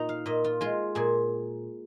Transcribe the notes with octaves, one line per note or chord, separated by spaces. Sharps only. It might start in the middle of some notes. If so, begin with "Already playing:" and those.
Already playing: A#2 D#4 A#5
F5
A#2 D#5
F4
G#3 F4
A#2 G#4